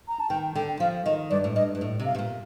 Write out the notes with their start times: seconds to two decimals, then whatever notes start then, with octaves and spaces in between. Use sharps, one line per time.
0.08 A#5
0.20 A5
0.29 D#3 G5
0.55 D3 G5
0.80 F3 F5
1.05 D#3 D#5
1.30 G2 D5
1.44 A2
1.56 G2 D#5
1.75 G2
1.81 A2
1.99 C3
2.06 F5
2.15 C3
2.19 A#2